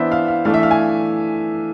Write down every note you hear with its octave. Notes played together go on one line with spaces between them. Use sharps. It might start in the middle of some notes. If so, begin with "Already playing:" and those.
Already playing: E3 B3 D4 C5 E5
F5
F5
E3 A3 D4 F5
E5
F5
G#5